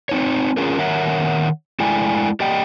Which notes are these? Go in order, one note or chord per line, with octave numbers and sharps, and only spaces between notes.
C4 D#4 C#5
C#4 F4 G#4 A#4
D#3 A#4 C#5 E5 F#5
G#3 A3 E4 D5 G5 G#5
G4 D5 D#5 G5